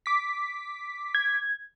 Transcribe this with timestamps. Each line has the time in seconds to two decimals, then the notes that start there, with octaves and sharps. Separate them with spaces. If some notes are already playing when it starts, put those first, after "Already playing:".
0.06 D6 B6
1.15 G#6